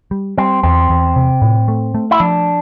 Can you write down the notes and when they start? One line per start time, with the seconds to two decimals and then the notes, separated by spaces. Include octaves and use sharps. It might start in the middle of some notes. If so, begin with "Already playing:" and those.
0.11 G3
0.38 G3 C4
0.63 E2 C4
0.89 E2
1.16 C3
1.42 A2
1.68 A3
1.94 A3
2.11 E4
2.20 F3 D4